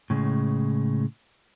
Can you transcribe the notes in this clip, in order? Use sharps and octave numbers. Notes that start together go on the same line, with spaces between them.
A2 C#3 G#3